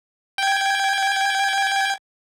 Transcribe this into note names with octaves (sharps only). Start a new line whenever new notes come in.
G5 G#6